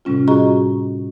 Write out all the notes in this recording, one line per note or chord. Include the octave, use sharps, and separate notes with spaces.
A2 C3 G3 C#4 F4
F4 F#4 G#4 D#5 A#5 C#6